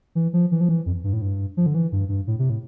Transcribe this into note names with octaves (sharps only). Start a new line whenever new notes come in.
E3
F3
E3
F3
E3
F2
G2
A2
G2
F3
D3
E3
G2
G2
A2
C3
A2